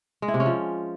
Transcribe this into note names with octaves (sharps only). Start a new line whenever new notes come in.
G#3
E4
C3
C#4
F3